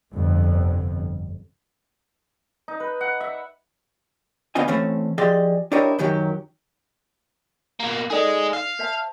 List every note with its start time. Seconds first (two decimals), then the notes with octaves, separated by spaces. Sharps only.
0.13 G1 F2 C3
2.68 D#4
2.80 B4
3.01 F#5
3.20 E5
4.55 D2 B3 C#4 F4 D#5 G#5
4.68 E3 A3 C4 C#4
5.18 F3 G4 G#4 D5 D#5 C6
5.72 D4 E4 G4 A#4 C#5 D#5
5.99 F#2 D#3 F#3 G4
7.80 B2 A#3
8.10 D#4 G#4 A4 D5 D#5
8.53 F5
8.79 C5 E5 A5